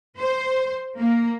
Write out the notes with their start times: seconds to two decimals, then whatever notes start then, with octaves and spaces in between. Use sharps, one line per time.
0.17 C5
0.99 A#3